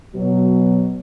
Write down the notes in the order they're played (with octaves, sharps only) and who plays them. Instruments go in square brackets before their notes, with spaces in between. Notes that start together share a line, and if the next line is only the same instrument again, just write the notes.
[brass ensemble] B2 F#3